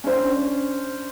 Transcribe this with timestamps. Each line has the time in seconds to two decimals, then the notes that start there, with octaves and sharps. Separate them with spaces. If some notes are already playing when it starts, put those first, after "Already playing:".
0.04 C#4 D4 C5